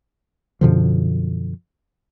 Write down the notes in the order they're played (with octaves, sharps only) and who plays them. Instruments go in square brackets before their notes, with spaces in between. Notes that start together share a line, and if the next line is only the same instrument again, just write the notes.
[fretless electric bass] F#2 B2 D3 F3